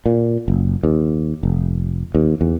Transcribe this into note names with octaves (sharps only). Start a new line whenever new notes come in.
A#2
F#1
D#2
F1
D#2
E2